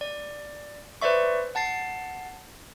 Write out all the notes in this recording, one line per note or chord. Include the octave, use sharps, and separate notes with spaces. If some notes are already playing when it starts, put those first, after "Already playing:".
D5
B4 C5 D5 E5 C#6
F#5 A5 A6 C7